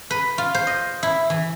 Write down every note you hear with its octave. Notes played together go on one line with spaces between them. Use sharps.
B4
F4
C5
D#5
E4
E3